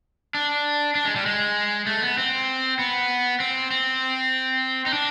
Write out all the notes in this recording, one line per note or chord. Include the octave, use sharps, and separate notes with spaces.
D4
D4
G#3
G3
G#3
A3
B3
C4
B3
C4
C4
D#4
D4